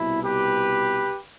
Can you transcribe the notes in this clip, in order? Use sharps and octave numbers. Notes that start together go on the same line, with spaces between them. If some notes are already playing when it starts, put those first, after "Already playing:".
Already playing: C2 B2 E4
G4 B4